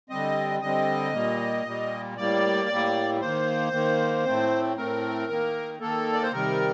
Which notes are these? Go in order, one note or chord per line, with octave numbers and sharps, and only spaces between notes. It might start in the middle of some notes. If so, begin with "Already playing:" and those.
D3 G3 C4 D#5
D3 G3 C4 D#5
A#2 G3 A#3
A#2 G3 A#3
A2 G3 A#3 D5
A2 G3 A#3
D#3 A#3 C5
D#3 A#3
A2 A3 C4
A2 A3 C4 A#4
D#3 A#3
D#3 A#3 A4
D5
C5
C3 D#3 G3 A#4